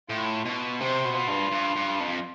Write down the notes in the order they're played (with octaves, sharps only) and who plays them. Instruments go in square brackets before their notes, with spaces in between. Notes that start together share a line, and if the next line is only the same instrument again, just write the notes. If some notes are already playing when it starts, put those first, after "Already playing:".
[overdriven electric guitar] A2 [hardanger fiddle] F4
[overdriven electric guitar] B2
[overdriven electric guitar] C3 [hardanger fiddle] C5
[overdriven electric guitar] B2
[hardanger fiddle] F4
[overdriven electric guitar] G2
G2
G2
F2